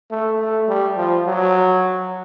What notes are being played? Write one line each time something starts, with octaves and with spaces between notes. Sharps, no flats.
A3
A3
G3
F3
F#3